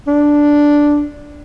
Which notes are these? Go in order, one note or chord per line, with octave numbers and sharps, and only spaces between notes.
D4